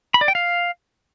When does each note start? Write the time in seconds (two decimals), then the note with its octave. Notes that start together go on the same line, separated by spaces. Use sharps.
0.14 B5
0.21 D5
0.28 G5
0.35 F5